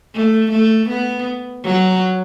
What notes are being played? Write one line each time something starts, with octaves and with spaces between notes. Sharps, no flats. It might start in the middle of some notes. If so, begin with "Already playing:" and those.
A3
A3
B3
F#3